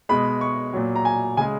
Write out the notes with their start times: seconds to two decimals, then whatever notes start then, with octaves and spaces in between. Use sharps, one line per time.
0.09 B2 G#3 B5
0.41 C#6
0.73 A#2 F#3
0.96 A#5
1.05 G#5
1.37 C#3 G#5
1.41 G#3